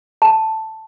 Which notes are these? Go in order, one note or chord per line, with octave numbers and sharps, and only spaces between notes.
A5